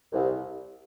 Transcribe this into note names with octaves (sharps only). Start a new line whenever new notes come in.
C2